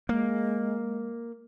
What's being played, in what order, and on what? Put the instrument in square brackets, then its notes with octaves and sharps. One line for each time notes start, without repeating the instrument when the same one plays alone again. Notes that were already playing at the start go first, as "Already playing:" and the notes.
[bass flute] G#3 [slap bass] A#3